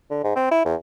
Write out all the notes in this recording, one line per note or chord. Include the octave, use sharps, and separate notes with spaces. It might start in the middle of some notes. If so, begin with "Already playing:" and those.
D3
G#2
C4
E4
E2